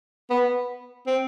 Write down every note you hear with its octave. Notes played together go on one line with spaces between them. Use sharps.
B3
C4